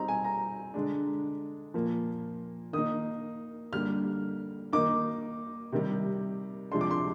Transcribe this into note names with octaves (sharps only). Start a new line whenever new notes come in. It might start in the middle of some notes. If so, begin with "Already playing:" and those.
Already playing: G3 C4 D#4 A#5
G#5
A#5
D3 G#3 D4
A#2 F3 A#3
D#3 A#3 D#4 D#6
D3 G3 A#3 F6
D#3 A#3 D#4 D6
C3 D#3 G3
C3 F3 G#3 D4 C6
D6
C6